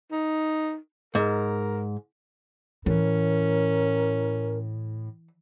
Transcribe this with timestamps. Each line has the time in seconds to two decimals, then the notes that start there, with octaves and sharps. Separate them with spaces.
0.11 D#4
1.15 G#2 A#4
2.86 A2 E3 C#4 A#4